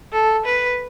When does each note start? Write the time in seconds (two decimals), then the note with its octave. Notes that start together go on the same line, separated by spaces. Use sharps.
0.13 A4
0.46 B4